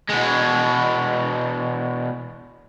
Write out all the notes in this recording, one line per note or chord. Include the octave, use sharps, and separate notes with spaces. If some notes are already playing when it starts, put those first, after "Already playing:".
B2 G#3